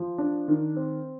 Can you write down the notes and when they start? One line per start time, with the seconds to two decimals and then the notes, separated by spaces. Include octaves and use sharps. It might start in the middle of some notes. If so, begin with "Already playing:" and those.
Already playing: F3
0.18 D4
0.48 D#3
0.76 C4